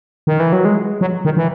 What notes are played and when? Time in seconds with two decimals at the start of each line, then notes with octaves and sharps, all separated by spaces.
0.27 D#3
0.40 E3
0.53 F#3
0.65 G#3
1.01 F#3
1.25 D#3
1.37 E3